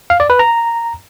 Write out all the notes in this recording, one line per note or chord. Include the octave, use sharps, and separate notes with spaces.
F5
D5
B4
A#5